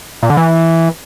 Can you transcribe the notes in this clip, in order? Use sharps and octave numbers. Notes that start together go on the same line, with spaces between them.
A#2
D3
E3